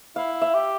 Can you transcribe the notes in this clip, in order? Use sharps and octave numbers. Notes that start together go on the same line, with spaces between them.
E4 F5
E5
G4